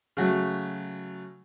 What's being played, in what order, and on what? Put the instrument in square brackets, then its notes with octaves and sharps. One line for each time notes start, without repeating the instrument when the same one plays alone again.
[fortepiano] C#3 F#3 A3